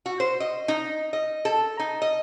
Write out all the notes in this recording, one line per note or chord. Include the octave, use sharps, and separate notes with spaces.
F#4
C5
D#5
D#4
D#5
A4
D#4
D#5